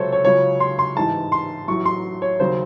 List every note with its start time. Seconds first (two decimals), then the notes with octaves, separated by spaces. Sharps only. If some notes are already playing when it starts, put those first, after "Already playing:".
Already playing: C#2 C3 F#3 A4 C5 C#5
0.12 C#5
0.25 C#2 C#3 F#3 C#5
0.60 C6
0.79 C6
0.96 A1 G#2 E3 G#3 A5
1.32 C6
1.68 A1 A2 F#3 C#6
1.85 C6
2.22 C#5
2.39 D#2 C#3 F#3 C5